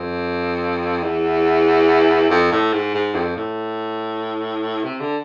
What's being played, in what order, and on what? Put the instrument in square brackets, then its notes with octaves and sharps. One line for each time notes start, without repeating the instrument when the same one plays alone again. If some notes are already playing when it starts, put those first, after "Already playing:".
Already playing: [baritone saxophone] F2
E2
F2
A2
G#2
G#2
F2
A2
C3
D3